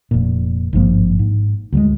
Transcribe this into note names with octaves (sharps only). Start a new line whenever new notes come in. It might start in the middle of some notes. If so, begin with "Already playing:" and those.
F1 A#2
G#1 G2 F3 A#3
G#2
D2 F#3 G#3